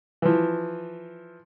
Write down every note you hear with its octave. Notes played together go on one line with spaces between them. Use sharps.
E3 F3